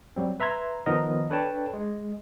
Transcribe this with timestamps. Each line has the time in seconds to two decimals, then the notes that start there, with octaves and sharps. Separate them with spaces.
0.16 F#3 G3 C4
0.40 B4 E5 A#5 C6 G#6
0.86 D#3 F3 B3 D#4 A#4 D#5
1.30 D4 A4 B4 C#5 G5 A5
1.74 G#3